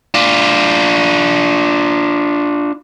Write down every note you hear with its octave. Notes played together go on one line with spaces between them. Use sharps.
D4 F4